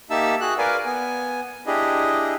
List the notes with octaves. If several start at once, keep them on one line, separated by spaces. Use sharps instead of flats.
A#3 D#4 G4 E5 A5 E6
F#4 G#4 F#6
A#4 B4 D5 F5 G#5
B3 G#5
D4 E4 G4 G#4 D#5